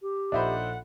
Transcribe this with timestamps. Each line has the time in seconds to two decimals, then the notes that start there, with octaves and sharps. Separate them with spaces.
0.02 G4
0.32 A#1 D4 D#4 A4 C5 E5 F#5 B5